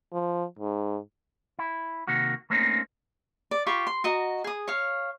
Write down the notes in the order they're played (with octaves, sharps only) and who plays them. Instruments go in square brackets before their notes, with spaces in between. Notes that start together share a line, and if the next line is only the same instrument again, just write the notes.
[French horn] F3
G#2
[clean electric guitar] E4
C3 D#3 A#3 F#4
A3 A#3 C4 C#4 D#4
[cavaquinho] D5
F4 G4 B5 C#6
C6
F#4 D#5 A#5
G#4 D#6
C#5 F5